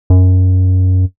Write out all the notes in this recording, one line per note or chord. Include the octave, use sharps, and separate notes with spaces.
F#2